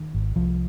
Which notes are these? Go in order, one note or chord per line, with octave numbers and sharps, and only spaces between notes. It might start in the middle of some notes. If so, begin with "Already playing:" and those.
Already playing: D#3
G#1
C2 F3